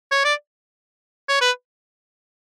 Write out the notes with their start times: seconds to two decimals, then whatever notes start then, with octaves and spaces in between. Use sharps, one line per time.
0.11 C#5
0.24 D5
1.28 C#5
1.41 B4